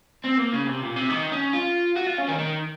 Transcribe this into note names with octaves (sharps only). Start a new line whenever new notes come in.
C4
A#3
C#3
C3
A#2
C3
D#3
C#4
F4
F#4
F4
C#4
D#3
D#3